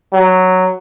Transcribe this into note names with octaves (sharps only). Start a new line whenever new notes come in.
F#3